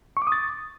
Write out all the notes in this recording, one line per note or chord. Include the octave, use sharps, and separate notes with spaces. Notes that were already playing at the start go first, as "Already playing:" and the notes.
C#6
D6
D#6
A6